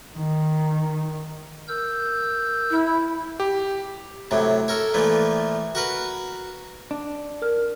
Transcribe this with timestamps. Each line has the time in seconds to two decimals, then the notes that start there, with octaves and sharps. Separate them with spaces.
0.15 D#3
1.68 A#4 E6 G6
2.71 E4
3.40 G4
4.31 A2 C3 F#3
4.68 A4 A#4 C#5
4.94 A#2 E3 F3 A3
5.75 F#4 A#4 B4
6.91 D4
7.42 A#4 F6